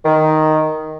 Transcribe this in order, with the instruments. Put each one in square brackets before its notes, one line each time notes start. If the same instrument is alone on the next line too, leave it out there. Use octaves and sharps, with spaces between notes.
[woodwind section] D#3